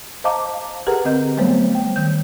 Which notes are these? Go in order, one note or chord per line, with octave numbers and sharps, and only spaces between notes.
C5 D#5 F5 A5 A#5 D6
G4 G#4 A#4 B4 F#5 A#5
D3 C4 D#5 G6
F#3 G3 A3 B3 C5 C#5
G5
D#3 G6